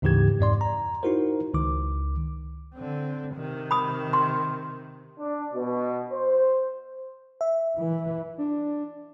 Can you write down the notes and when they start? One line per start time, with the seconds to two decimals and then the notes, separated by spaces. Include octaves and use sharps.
0.02 D2 G#2 C#3 E3 G4 G#6
0.39 F2 G#2 D5 C6
0.61 A#5
1.03 D#4 E4 F#4 A#4 C5
1.54 C#2 D#3 D6
2.75 D3 C4
3.35 C3 D#3
3.71 B5 D#6
4.13 C6
5.19 D4
5.54 B2
6.11 C5
7.41 E5
7.76 E3
8.38 D4